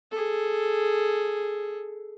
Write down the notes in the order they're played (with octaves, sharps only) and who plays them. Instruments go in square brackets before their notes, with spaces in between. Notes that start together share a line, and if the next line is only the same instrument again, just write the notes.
[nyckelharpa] G#4 A4